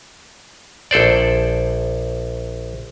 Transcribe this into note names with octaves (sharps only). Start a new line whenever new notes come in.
A#1 A4 C5 D5